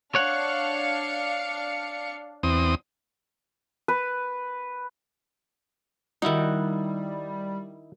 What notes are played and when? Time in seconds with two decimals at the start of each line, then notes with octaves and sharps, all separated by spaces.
0.15 D4 C#5 F5 F#5 C#7
2.43 E2 C4 D#6
3.88 B4
6.22 D#3 G3 D#4 E4 F#4